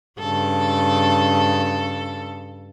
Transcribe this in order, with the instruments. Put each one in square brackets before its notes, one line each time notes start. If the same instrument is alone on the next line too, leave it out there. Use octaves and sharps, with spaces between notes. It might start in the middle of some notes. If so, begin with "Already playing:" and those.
[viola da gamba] G2 C#3 A4